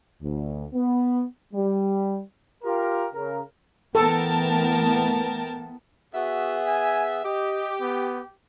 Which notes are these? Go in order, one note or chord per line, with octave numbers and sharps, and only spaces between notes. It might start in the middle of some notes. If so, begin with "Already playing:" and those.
D2
B3
G3
F4 G4 A#4
C#3 A#4
E3 A3 B3 A4 A#4 G5 A5
B3 F#4 G#4 E5
G#5
G4 D#5
B3